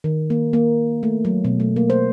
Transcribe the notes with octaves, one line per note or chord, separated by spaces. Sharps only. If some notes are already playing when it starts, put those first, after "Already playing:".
D#3
A#3
A#3
A3
F#3
B2
A3
A#3
C5